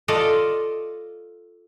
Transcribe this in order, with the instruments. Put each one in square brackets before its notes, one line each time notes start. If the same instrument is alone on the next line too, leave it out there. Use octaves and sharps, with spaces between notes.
[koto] F4 A4 D5 D#5 F5